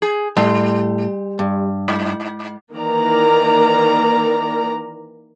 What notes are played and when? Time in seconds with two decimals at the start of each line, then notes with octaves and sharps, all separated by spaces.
0.02 G#4
0.37 A2 G3
1.39 G2
1.88 G#2
2.73 D#3 E3 A#3 A#4 D5 A#5